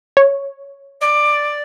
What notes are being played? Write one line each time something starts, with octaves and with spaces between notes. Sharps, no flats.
C#5
D5